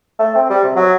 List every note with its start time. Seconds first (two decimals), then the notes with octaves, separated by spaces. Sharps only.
0.19 A3
0.35 C4
0.50 G3
0.64 C3
0.76 F#3